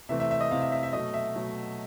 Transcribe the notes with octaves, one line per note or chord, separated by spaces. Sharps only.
C3 E3 A3 C4 E5
E5
E5
D#5
C3 E3 A3 C4 F5
E5
E5
E5
B2 F#3 A3 D#5
E5
B2 F#3 A3